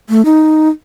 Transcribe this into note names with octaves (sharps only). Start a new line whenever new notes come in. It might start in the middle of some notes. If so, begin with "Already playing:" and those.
A3
D#4